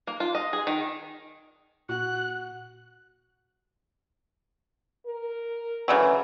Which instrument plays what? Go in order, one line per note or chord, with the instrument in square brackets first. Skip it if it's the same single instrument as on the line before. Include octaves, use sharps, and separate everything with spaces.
[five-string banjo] A#3
F4
D#5
G#4
D#3
[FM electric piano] A#2 F#5 [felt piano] F#4 [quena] F#6
[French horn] A#4
[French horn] D2 [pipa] C#3 E3 F#3